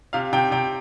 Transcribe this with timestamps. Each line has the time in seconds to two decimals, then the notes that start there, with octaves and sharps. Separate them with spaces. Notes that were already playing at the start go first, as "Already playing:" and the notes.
0.13 C3 F5
0.33 C3 G5
0.51 C3 G5